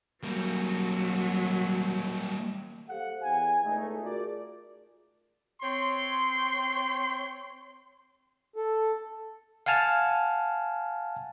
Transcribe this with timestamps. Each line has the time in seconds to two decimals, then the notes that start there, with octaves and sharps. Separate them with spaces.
0.23 F#3 G3 A#3
2.90 G4 A4 C5 F5 F#5
3.23 E2 G#5
3.64 C#2 A3 D#4
4.03 F4 F#4 G#4 A#4 D5
5.62 C4 C#5 C6
8.56 A4
9.66 F5 F#5 G#5 A5 F6